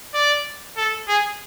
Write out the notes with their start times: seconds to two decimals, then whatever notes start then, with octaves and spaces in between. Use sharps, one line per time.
0.14 D5
0.77 A4
1.08 G#4